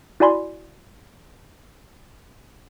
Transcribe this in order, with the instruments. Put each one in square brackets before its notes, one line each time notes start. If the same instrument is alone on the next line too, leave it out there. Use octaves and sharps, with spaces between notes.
[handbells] E4 F#4 D5 G#5 B5 C6